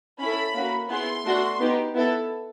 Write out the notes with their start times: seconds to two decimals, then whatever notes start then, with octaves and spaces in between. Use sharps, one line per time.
0.19 C#4 E4 A4 B5
0.54 A#3 C#4 F#4
0.89 B3 E4 G#4 C6
1.24 A3 D4 F#4
1.59 B3 D#4 G4
1.94 B3 E4 A4